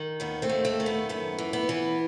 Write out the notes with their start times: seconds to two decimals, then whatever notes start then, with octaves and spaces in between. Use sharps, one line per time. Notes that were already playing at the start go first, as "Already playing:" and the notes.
Already playing: D#3
0.20 D#2 B3
0.42 A3 C4
0.49 D#2
0.65 A3
0.80 D#3
0.86 B3
1.09 F#2 B3
1.38 E3
1.53 B3
1.69 E3